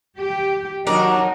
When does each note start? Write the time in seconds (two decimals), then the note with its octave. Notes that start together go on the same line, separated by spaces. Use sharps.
0.18 G4
0.87 D#2 F#3 D4 D#4 A#4